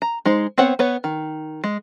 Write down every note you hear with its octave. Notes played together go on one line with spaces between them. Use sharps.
A#5
G#3 D#4 C5
B3 C4 C5 C#5 F#5
B3 B4 C#5
D#3
G#3